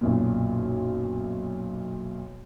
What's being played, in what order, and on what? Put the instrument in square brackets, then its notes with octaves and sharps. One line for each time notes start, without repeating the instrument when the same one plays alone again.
[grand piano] B1 F#2 A#2